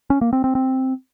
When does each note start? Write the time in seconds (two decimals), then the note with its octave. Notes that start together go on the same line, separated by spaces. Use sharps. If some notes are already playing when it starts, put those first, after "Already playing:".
0.10 C#4
0.21 A#3
0.33 C4
0.44 C4
0.55 C4